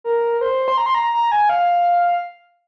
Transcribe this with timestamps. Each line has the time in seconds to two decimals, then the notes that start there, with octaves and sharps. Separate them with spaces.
0.04 A#4
0.41 C5
0.68 C6
0.78 A#5
0.86 C6
0.95 A#5
1.13 A#5
1.32 G#5
1.49 F5